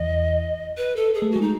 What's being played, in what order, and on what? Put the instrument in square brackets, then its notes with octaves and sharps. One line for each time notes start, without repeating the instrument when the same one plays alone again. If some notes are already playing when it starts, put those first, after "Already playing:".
Already playing: [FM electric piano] E2 E3 [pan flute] D#5
[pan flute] B4
A4
G#4
[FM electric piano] A3
[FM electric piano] G#3 [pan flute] F#4
[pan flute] D#4